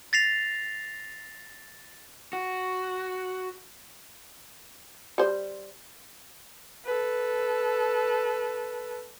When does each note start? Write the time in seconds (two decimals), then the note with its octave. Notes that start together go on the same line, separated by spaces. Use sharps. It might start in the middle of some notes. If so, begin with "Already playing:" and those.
0.13 A6 A#6 C7 F7
2.33 F#4
5.18 G3 C5
6.85 A4 B4